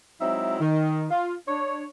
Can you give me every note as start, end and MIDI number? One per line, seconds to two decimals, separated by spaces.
0.20 0.59 54
0.20 0.59 56
0.20 0.59 60
0.20 0.59 63
0.20 0.59 64
0.20 0.59 76
0.59 1.05 51
1.11 1.35 65
1.48 1.84 62
1.48 1.84 73